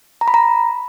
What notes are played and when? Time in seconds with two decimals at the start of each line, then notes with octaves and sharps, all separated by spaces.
0.21 A#5
0.28 B5
0.34 A#5